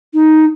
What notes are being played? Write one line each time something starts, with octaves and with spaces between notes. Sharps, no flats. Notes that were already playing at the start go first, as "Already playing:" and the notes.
D#4